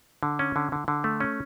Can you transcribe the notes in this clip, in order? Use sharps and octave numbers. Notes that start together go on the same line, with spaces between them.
D3
C#4
D3
D3
D3
A3
C#4